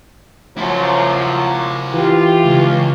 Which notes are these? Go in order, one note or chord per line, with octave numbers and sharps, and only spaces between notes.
F3 F#3 E4 C5
E3 F4 G4
C#2